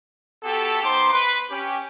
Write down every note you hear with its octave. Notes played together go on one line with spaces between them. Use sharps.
B3 F#4 G4 A4
B3 D#4 C5 C6 D6
B4
C#4 G4